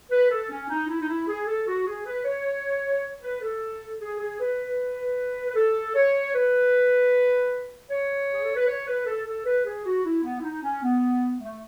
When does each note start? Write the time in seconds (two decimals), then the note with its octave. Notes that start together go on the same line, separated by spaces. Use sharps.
0.10 B4
0.30 A4
0.49 C#4
0.68 D#4
0.88 E4
1.00 D#4
1.08 E4
1.27 G#4
1.46 A4
1.66 F#4
1.86 G#4
2.05 B4
2.24 C#5
3.22 B4
3.42 A4
4.00 G#4
4.19 G#4
4.39 B4
5.49 B4
5.55 A4
5.95 C#5
6.33 B4
7.90 C#5
8.32 G#4
8.44 A4
8.56 B4
8.68 C#5
8.87 B4
9.06 A4
9.25 A4
9.45 B4
9.65 G#4
9.85 F#4
10.04 E4
10.23 B3
10.39 E4
10.43 D#4
10.62 C#4
10.82 B3
11.40 A3